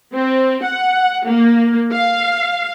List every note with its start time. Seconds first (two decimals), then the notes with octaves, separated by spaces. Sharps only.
0.13 C4
0.64 F#5
1.28 A#3
1.93 F5